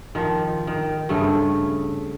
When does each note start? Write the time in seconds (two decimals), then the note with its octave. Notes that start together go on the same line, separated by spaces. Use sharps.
0.15 D#3 F3
0.67 D#3
1.09 G2 C#3 A3